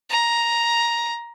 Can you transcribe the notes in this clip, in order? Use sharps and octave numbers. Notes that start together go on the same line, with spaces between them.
A#5